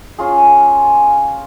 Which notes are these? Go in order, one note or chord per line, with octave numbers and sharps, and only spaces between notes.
C#4 F4 G#4